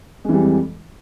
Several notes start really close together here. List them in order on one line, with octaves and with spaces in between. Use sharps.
G#3 E3 G3 F2